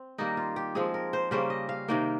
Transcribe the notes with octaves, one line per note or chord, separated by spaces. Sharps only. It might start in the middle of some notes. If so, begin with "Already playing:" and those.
Already playing: C4
D#3 G3 A#3 D#4
F4
G4
F3 G#3 C4 G#4
A#4
C5
C#3 G3 A#3 C#4 C5
D#5
F5
C3 D#3 A#3 G5